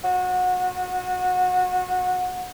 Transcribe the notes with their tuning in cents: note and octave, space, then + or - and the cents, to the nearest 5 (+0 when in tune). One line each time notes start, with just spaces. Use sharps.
F#4 -25